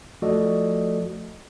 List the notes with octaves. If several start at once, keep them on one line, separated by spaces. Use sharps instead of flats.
F3 A3 F#4 A4 D5 D#5